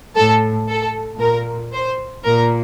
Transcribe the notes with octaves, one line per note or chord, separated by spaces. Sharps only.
A2 A4
A4
A#2 A#4
C5
A#2 A#4